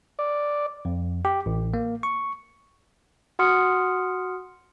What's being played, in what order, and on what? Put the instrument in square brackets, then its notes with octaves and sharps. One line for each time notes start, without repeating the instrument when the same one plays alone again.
[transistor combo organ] D5
[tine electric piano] F2
G4
A1
A#3
C#6
[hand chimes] F#4 F#5 C6 D#6 F6 C#7